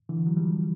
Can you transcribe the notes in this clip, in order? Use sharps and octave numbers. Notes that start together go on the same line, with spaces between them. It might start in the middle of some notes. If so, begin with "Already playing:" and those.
D3 E3
F#3
F3 G3